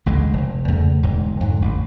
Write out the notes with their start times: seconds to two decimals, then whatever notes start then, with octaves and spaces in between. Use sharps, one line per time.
0.06 A1 D2 D3 G#3
0.33 F1
0.68 E2 C#3 A3
1.03 E1 D2 G#2
1.40 F2 G#2 D3
1.62 A1 E2